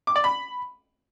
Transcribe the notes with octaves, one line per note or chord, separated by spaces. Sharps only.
D6
D5
B5